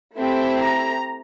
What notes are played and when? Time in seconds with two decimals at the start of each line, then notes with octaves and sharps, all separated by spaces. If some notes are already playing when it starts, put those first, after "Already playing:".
0.16 A3 C4 E4 G4
0.60 A#5